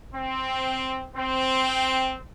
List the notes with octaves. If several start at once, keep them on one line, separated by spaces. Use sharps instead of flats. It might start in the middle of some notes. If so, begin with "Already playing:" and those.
C4
C4